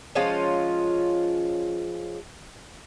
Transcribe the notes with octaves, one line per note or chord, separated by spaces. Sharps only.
F3 G#3 C#4 F4